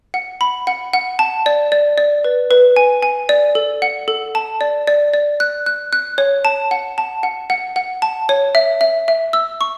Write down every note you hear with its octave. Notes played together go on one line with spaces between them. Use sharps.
F#5
B5
F#5
F#5
A5
D5
D5
D5
B4
B4
G#5
G#5
D5
A4
F#5
A4
A5
D5
D5
D5
F#6
F#6
F#6
C#5
A5
F#5
A5
F#5
F#5
F#5
A5
C#5
E5
E5
E5
E6
C#6